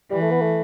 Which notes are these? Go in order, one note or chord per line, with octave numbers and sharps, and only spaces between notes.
E3 G3
A3
B3
A3